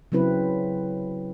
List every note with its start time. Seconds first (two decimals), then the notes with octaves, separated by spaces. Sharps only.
0.12 C#3 F#3 C4 E4 B4